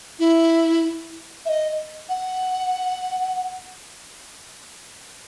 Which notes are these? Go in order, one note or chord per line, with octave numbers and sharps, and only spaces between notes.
E4
E5
D#5
F#5